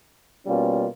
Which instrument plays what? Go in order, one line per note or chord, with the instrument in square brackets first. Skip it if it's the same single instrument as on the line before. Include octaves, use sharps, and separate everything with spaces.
[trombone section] B2 G3 A#3 C#4 F4